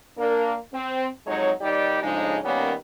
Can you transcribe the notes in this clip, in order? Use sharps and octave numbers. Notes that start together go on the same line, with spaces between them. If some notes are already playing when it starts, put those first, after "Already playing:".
A#3 D4 A#4
C4
F2 F#3 G#3 D#4 C#5
D#2 G3 D#4 G4 D5
A2 C#3 F3 G#3 D4 D#4
D#3 G3 A#3 B3 C#4